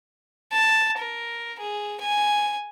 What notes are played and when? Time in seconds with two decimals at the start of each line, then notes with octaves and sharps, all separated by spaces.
0.52 A5
0.98 A#4
1.59 G#4
2.01 G#5